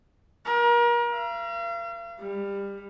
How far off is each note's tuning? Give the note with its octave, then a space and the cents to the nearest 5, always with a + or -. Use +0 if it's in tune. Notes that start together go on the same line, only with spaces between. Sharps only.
A#4 +35
F5 -40
G3 +25